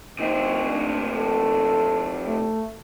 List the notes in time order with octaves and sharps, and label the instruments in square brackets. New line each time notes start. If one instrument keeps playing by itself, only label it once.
[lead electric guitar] C3 D#4 [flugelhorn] C4
[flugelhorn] D4
A4
A3